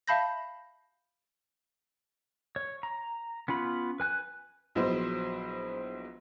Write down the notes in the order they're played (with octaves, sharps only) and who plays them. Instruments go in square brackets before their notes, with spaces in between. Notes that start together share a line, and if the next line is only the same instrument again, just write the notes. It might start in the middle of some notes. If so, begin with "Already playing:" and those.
[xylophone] E5 F5 A5 B5 G6 A#6
[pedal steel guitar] C#5
A#5
B3 C#4 F4 B5
B4 G#5 F#6
[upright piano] A#1 F#3 G#3 B3 E4 C5